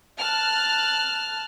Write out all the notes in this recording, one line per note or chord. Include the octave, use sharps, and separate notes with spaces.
A5 F6 F#6